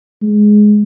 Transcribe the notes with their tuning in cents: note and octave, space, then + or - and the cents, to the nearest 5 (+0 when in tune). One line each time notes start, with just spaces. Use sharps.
G#3 +5